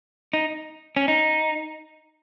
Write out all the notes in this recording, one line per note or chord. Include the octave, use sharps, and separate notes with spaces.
D#4
C#4
D#4